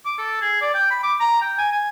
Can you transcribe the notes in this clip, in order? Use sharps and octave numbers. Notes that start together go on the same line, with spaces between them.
D6
A4
G#4
D5
G5
B5
D6
A#5
G5
G#5
G#5